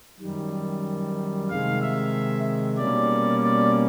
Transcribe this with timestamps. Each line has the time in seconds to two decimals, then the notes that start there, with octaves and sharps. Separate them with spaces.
0.20 F#2 D#3 G3
1.49 C3 D#3 G#3 F5
1.82 E5
2.78 B2 G3 A#3 C#4 D5
3.42 D5